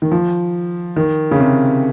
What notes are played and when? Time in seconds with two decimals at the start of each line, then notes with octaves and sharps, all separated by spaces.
0.02 D#3
0.11 F3
0.96 D#3
1.31 C#3
1.40 C3